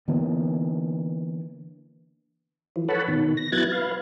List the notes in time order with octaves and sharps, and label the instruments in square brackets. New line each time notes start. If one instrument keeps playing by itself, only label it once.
[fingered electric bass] D3 E3 A#3 B3
[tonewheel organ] E3 F3
A4 B4 C#5 F#5 A5 B5
B2 D#3
A#6
F#3 B3 E4 F#6 G#6 A6
B4 F5